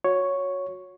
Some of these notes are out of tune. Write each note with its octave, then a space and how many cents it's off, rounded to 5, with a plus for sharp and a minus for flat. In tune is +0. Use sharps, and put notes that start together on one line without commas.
F#4 -20 C#5 +0